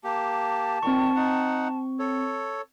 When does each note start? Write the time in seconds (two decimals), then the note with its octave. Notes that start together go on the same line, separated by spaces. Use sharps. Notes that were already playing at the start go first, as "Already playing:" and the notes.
0.04 A#3 G4 A5
0.83 A#2 D#3 C4 C#6
1.16 D#4 F#5
1.99 A4 C#5